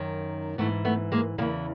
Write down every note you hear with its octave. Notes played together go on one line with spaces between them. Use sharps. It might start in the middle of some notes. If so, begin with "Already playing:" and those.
Already playing: F#2 D#3
G#2 E3 A3 B3
A3 B3
G#3 A#3
E2 C#3 E3 G#3 A#3